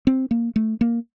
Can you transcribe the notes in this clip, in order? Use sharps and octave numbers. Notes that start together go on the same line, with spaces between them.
C4
A#3
A3
A#3